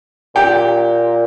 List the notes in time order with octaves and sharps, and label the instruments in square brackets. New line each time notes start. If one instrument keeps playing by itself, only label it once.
[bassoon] A#2 [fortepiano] G4